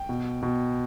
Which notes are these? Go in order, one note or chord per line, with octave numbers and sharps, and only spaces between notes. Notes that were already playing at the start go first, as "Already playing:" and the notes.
Already playing: G5
B2
B2